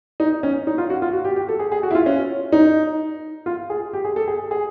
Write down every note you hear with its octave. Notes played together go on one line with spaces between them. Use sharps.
D#4
C#4
D#4
F4
F#4
F4
F#4
G4
G4
A4
G#4
G#4
F#4
E4
F4
C#4
D#4
F4
G#4
G4
G#4
A4
G#4
G#4